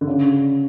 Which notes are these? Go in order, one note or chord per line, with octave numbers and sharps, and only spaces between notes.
D3
C#3